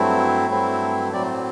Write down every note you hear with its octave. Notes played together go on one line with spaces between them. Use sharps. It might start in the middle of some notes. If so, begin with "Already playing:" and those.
Already playing: G2 F#3 A3 C4 E4
G2 F#3 A3 C4 E4
A2 F#3 C4 D5